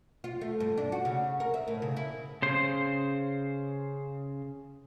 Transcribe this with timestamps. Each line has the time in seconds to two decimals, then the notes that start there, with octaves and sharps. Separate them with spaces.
0.24 F4
0.41 A3
0.60 G2
0.77 D4
0.92 F#4
1.05 C#3
1.40 A#4
1.54 E5
1.68 A2
1.82 C#3
1.97 E4
2.42 C#3 C5